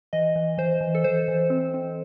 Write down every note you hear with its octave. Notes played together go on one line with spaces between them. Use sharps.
E3 D#5
E3
E3 C5
E3
A4
E3 C5
E3
C4
C4